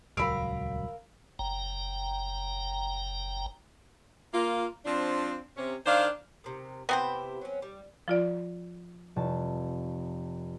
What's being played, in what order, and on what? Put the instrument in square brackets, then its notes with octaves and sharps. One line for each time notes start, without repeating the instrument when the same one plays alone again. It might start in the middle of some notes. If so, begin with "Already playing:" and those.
[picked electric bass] D#1 C#2 F#3 [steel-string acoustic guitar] A#4 F5 [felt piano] B5 E6 D7
[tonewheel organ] F#1 G5 A#5
[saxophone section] A#3 F4
F3 C4 D4
C3 C#4
D#3 D4 C5 F5
[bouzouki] C3 D#3
[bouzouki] C3 E4 G4 [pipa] B3 C4 C5
[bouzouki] F#3 C#4
G3
[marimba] F3 F4 D5
[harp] F1 A5